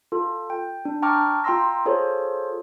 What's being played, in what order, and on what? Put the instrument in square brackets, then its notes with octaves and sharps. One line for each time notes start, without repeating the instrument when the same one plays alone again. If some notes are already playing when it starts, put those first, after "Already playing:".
[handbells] F4 A4
G5
D4
G5 A5 A#5 C#6 D6 F6
F4 G5 A#5 C6 E6 A#6
F4 G#4 A4 C5 C#5